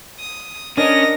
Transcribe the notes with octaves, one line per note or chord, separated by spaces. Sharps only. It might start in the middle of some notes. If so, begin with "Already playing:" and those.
D#6
C#4 D4 A#4 D#5 A#6